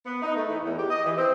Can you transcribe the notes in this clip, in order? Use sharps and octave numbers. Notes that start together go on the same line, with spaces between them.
B3
D#4
A3
E3
E2
G4
D#5
E3
C4